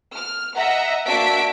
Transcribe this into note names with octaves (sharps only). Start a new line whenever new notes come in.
F6
D#5 E5 F#5 A#5
A#3 D4 F#4 E5 B6 D7